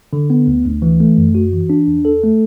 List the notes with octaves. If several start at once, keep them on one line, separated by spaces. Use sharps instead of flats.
D3
B3
D2
D2
E3
A3
F#2
F#4
E3
D4
E2
A4
A3